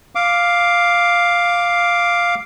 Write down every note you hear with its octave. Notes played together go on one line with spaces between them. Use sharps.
F5 D6